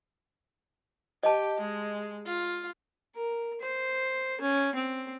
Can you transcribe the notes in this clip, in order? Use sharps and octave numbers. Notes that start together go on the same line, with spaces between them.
G4 D#5 A5
G#3
F4
A#4
C5
C#4
C4